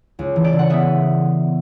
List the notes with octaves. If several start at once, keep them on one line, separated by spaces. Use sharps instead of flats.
C#2
E3
D5
C#3
F#5
B3 E5